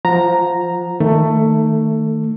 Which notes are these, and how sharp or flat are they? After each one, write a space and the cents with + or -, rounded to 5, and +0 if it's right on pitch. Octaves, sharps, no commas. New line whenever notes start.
F3 +0 F#5 -30 A#5 +0
D#3 +0 A3 +15